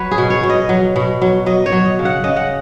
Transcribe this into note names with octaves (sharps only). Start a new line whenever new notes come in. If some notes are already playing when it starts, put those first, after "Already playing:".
Already playing: F#3 B4 C#5
G#4
B2
C#5
B2
D#5
F#3
B2
F#3
F#3 D#5
C#5
F#3
D#5
C#3
F#5
C#3 D#5
F#5